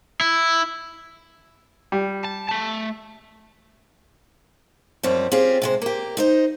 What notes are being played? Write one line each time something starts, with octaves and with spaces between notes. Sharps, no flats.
E4
G3
A5
A3 A5
F#2 F3 G3 C4
C4 C#4 F4 G4 G#4
C3 G#3 C5
A#3 G4
D#4 C5 D#5